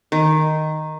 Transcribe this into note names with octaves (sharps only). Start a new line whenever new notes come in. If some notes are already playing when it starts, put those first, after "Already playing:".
D#3